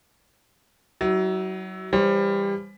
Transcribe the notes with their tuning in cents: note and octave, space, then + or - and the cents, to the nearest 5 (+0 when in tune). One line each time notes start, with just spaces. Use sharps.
F#3 +25 E4 -30
E3 +30 G3 +20 C5 +40